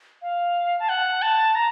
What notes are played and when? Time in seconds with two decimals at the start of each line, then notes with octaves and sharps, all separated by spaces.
0.22 F5
0.79 A5
0.89 F#5
1.22 A5
1.55 A#5